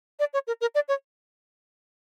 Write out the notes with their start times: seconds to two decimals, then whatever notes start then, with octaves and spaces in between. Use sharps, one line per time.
0.19 D5
0.34 C#5
0.47 A#4
0.61 A#4
0.75 D5
0.88 C#5